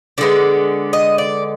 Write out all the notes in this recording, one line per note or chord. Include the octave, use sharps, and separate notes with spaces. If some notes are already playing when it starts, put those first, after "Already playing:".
D3 G#3 B3 D5
D#5
D5